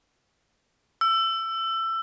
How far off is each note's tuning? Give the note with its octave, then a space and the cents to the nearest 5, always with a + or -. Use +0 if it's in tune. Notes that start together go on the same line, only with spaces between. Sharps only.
E6 +20